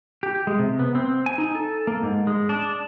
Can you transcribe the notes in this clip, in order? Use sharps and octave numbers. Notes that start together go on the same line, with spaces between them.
G4
G#3
C3
B3
C4
G#5
D#4
A4
A#3
G#2
G#3
D4